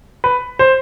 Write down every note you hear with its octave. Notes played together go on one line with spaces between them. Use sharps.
B4
C5